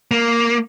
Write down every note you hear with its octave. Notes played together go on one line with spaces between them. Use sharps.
A#3